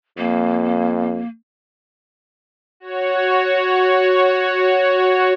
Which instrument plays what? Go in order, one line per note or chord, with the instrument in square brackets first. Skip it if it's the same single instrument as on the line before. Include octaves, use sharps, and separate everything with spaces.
[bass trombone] F2 [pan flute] A#3
[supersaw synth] F#4 C#5